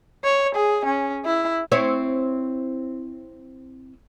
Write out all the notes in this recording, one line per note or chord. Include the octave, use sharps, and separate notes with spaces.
C#5
G#4
C#4
E4
C4 E4 C#5